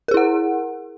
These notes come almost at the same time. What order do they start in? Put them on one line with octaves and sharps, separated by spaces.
A#4 G#4 E4 F#5